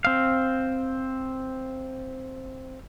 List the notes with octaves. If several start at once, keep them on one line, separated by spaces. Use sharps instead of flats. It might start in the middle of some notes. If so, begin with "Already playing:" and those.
C4 F5